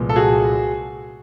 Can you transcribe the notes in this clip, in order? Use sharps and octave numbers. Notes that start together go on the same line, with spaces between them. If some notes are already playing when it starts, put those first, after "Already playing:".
Already playing: C2 A#2 F3 G#3 B3
A4
F#4 G#4